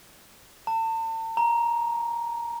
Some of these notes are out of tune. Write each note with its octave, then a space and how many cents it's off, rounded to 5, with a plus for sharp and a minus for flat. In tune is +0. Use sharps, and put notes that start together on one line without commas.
A5 +40
A#5 +10